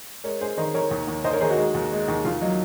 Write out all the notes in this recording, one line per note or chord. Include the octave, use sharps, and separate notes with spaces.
G#3 A#4 C#5
G#3 G#4 C5
D#3 C5 D#5
D#3 A#4 C#5
D#2
D#2
D#2 C5 D#5
A#4 C#5
D#3 G#4 C5
D#4 F#4
G#3
D#2
G#3
D#2
D#2 F4
F#3 D#4